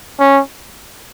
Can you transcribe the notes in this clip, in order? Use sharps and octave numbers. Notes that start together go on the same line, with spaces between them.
C#4